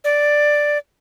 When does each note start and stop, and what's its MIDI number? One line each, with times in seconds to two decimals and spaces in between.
0.04 0.78 74